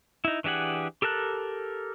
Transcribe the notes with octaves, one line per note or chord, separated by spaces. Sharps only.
D#4 E4
E3 D4 G4 G#4 F#5
G4 A4 A#4 A5 F#6